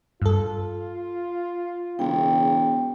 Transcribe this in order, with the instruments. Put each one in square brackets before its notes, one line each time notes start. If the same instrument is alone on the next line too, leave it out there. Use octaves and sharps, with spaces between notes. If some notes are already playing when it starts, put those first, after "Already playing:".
[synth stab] G2 A4 [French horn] F4
[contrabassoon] E1 [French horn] C#3 [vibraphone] G5